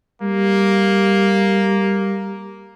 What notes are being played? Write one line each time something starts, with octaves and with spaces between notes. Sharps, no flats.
G3 A#3